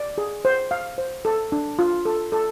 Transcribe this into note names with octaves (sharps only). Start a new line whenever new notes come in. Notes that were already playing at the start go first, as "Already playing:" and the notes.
Already playing: D5
G#4
C5
F5
C5
A4
D4
F4
A4
A4